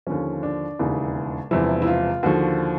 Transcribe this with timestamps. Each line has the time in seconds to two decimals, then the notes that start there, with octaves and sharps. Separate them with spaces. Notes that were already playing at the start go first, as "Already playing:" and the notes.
0.07 D#2 D3 F3 C#4
0.43 D4
0.79 E1 D#2 C#3 E3
1.51 E1 E2 C3 F3 E4
1.82 E4
1.87 F4
2.23 D#2 D3 F3 F#4